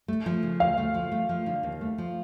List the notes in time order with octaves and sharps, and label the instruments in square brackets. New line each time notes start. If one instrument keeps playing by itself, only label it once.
[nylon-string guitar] A3
F3
C#3
[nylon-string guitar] D2 [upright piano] F5
[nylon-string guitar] A3
F3
A3
F3
D3
D#2
A3
F3